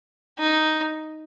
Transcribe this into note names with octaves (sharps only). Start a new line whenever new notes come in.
D#4